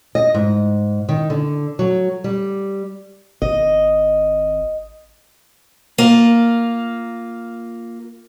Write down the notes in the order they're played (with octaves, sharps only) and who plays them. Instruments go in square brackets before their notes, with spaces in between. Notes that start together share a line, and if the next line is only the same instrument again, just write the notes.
[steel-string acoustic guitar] D#5
G#2
D#3
D3
F#3
G3
[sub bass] G#1 [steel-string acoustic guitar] D#5
[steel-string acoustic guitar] A#3 F4